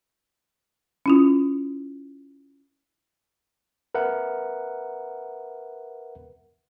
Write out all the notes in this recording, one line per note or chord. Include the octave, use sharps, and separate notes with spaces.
C#4 E4 F4
A#4 B4 E5 F#5